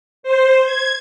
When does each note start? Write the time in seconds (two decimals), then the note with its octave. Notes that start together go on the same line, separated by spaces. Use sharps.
0.23 C5
0.65 G#6